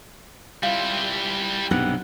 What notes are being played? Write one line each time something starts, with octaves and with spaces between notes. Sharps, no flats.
G3 E4 F4
B1 G2 C3 G4 B4 F#5